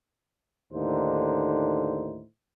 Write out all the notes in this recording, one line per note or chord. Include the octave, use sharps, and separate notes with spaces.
D#2 A2 D3 D#4 C5